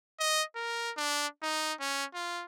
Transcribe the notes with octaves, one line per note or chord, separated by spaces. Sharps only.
D#5
A#4
D4
D#4
C#4
F4